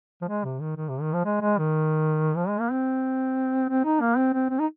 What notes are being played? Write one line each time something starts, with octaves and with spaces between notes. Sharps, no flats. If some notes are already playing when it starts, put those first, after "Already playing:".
F3
G#3
C3
D#3
D#3
C3
D#3
F3
G#3
G#3
D#3
F3
G#3
A#3
C4
C4
D#4
A#3
C4
C4
C4
D#4